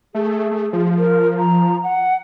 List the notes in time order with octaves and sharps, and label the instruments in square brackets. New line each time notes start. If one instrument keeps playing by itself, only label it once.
[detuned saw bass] A3 [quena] G#4
[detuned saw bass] A3
F3
[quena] A#4
A#5
F#5